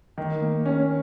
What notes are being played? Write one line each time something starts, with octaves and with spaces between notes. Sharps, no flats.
D#3
A#3
C#4